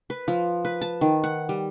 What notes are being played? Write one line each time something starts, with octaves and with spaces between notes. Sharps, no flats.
B4
F3
B4
A5
D#3
F#5
G3